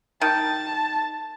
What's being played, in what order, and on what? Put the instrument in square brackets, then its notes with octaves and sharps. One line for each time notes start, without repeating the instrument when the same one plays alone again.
[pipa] D#3 [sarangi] A5